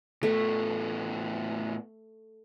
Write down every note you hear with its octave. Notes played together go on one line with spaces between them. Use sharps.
A2 A3 B3